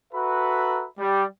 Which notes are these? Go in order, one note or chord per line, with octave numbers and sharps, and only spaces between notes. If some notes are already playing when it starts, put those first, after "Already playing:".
F#4 A4 B4 E5 A#5 B5
G3